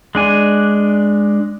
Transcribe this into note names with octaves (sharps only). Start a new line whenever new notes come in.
G#3 D4 G#5